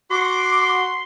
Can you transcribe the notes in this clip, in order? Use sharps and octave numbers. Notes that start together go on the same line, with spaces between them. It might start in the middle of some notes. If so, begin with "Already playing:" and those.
F#4 C6 D6